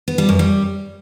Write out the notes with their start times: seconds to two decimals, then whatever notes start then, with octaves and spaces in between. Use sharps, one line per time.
0.08 B3
0.18 G3
0.29 F#2
0.39 G3